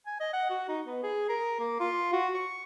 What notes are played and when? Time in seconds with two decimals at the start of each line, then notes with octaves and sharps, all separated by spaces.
0.07 G#5
0.20 D#5
0.33 F#5
0.50 F#4
0.68 D#4
0.86 B3
1.03 G#4
1.29 A#4
1.59 A#3
1.80 F4
2.13 F#4
2.34 C#6